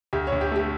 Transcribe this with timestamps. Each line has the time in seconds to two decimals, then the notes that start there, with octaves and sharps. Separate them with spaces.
0.13 D2 G4
0.27 C#5
0.32 D2
0.41 G4
0.51 A3 G4